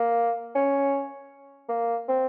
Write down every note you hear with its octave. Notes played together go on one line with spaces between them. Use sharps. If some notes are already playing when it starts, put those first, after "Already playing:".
Already playing: A#3
C#4
A#3
C4